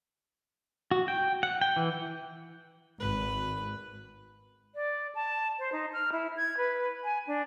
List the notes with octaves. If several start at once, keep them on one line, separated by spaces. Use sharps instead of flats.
F#4
G5
F#5
G5
E3
G#1 B4
D5
A5
C5
D#4
F6
E4
G#6
B4
G#5
D4